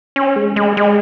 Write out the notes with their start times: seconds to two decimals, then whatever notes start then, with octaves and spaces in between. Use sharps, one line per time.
0.16 C#4
0.36 G#3
0.56 G#3
0.77 G#3